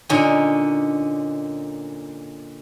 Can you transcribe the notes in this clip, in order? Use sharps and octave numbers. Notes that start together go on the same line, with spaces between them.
A#2 D3 C#4 D#4